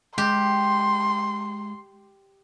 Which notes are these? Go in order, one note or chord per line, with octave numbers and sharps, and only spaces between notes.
G#3 G4 C6